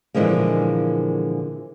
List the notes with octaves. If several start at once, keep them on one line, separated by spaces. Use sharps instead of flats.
A#2 D3 E3 F3 G#3 A#3